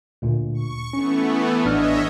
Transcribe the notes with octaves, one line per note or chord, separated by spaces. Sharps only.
D2 A#2
C#6
E3 A3 B3 C#4
A1 D4 C#5 D#5 E5 F6